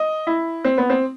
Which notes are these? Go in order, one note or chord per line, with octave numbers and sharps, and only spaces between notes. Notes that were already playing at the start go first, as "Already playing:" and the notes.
Already playing: D#5
E4
C4
B3
C4